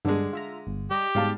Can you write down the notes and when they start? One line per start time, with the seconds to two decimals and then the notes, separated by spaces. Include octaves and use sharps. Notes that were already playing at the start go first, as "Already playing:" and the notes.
0.05 G2 D3 G#3 D4
0.33 F4 E5 A#5
0.67 G1
0.91 G3 G4 D#5 A#5
1.15 G#2 B2 G3 F5 A5